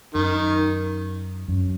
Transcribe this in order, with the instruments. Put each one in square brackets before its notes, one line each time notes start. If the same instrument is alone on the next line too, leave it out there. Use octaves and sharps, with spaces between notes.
[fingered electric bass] F#2 [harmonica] D#3
[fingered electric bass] F#2